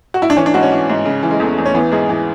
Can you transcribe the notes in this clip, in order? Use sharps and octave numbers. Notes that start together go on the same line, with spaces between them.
F#4
E4
D4
E3 C#4
D4
G#2 F#4
C#4
E3
G#2
C#3
E3
G#3
E2 A3
E2
C#4
E3 B3
G#2 G#4
E3